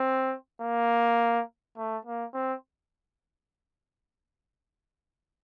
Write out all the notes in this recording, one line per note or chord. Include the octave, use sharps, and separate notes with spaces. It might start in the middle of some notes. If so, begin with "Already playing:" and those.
Already playing: C4
A#3
A3
A#3
C4